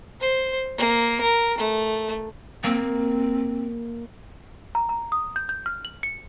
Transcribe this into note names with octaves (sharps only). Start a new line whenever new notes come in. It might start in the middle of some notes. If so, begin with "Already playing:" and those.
C5
A#3
A#4
A3
A#3 C4
A#5
A#5
D#6
G6
G6
F6
F#7
C#7